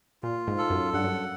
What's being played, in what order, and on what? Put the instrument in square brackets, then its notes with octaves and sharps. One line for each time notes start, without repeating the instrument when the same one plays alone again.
[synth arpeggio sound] A#2 [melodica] F4
[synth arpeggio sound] G#2
[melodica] A4
[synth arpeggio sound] F#2
[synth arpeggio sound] G2 [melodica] F#5
[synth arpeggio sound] F#2